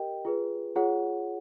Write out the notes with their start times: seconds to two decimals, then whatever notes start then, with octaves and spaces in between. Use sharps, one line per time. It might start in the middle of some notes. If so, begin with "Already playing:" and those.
Already playing: G4 A#4 D#5 G5
0.25 F4 G#4 B4
0.76 F4 G#4 C#5 F#5